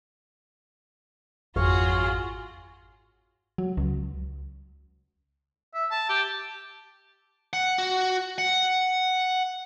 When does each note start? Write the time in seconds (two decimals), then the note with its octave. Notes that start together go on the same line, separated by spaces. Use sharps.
1.56 G#1 F2 F4 F#4 G#4 C#5 F5
3.58 F#3
3.77 C#2
5.74 E5
5.91 A5
6.09 G4
7.53 F#5
7.78 F#4
8.38 F#5